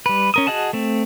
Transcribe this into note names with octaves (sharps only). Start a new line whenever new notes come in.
G3 B4
C#4 A#4 D#6
F#4 G#4 D#5 F#5 A5
A3 C4